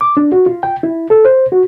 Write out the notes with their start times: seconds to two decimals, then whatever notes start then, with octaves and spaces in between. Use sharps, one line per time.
0.01 D6
0.17 D4
0.32 F#4
0.46 F4
0.63 G5
0.83 E4
1.10 A4
1.25 C5
1.52 F#4